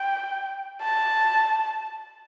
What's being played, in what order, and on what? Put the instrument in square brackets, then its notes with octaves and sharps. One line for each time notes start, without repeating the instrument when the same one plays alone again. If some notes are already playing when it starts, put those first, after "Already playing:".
Already playing: [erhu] G5
A5